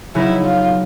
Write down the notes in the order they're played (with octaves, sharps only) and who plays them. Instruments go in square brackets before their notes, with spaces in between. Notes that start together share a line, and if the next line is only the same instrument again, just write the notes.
[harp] C#3 F#3 B3 D#4 [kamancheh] E4
[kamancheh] F4